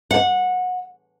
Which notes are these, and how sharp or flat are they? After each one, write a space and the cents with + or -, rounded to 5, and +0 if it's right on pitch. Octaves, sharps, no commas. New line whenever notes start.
F#5 -20